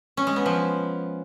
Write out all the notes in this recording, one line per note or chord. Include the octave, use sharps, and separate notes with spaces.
C#4
G#3
B3
F3